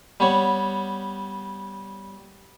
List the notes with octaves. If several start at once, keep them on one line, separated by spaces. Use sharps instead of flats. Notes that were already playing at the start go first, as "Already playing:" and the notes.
G3 B3 C#5